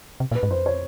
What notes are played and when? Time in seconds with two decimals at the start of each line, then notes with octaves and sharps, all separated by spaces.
0.20 C3
0.31 A#2
0.35 B4
0.43 G#2
0.49 F#2 C5
0.54 F2
0.66 C#5